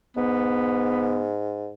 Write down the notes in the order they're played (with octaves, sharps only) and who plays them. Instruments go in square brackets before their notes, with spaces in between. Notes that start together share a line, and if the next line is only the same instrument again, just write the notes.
[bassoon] G#2 [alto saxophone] B3